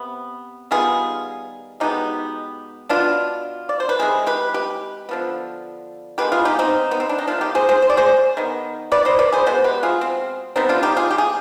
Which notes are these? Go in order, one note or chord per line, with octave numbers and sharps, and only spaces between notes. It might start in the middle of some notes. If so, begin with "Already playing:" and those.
Already playing: C3 B3
D#3 G3 B3 F4 G#4
B2 G#3 B3 D#4 G4
B2 B3 D4 F4
D5
C5
B4
C3 D#3 G#3 G#4
G4 B4
G4 B4
D3 F3 B3
D#3 G#3 B3 G4 B4
F4 G#4
D#4 G4
C4 D#4
B3
C4
D4
D#4
D#3 G#3 B3 D4 F4
D#4 G4
G#4 C5
G#4 C5
C5
D5
G#4 C5
D#3 B3
B4 D5
C5 D#5
B4 D5
G#4 C5
B2 G#3 B3 C5
G4 B4
F4 G#4
C4
D3 G3 B3 C4 D#4
D4 F4
D#4 G4
F4 G#4
G4
G#4